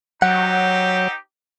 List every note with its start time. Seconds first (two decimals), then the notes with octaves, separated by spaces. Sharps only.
0.22 F#3 C4 D#4 G4 F#5